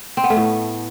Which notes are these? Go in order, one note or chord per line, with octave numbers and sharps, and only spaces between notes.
C4
B3
A3
A2